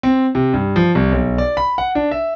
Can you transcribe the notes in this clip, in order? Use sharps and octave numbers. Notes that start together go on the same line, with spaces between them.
C4
C3
G2
F3
C2
B1
D5
B5
F#5
D4
E5